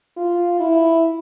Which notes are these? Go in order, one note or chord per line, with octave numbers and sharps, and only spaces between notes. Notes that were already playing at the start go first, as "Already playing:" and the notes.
F4
E4